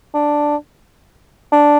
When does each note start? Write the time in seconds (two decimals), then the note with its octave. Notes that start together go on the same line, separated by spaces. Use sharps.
0.14 D4
1.52 D4